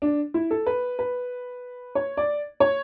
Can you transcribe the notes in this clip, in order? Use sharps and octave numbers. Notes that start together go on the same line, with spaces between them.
D4
E4
A4
B4
B4
C#5
D5
C#5